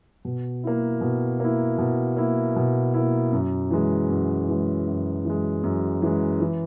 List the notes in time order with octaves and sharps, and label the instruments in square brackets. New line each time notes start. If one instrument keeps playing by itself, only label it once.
[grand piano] B2
A#3 E4
B2
A#3 E4
B2
A#3 E4
B2
A#3 E4
F#2
E3 G#3
F#2
E3 G#3
F#2
E3 G#3
F#2
E3 G#3
E3